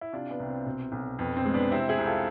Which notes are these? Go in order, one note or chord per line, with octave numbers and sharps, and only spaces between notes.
E4
C3 D4 F4
B3 D4
C2
C4
B2 C4
B1
F2 B3
C4
G#3
B3 D4
C3 C4 E4
E4 G#4
C2
F4 A4